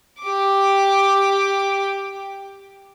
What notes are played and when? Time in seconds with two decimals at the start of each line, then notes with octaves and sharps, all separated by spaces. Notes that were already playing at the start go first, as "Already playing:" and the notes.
0.22 G4 D6